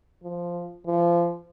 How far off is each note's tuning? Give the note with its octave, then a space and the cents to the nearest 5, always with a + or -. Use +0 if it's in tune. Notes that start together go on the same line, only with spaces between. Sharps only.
F3 -5
F3 -25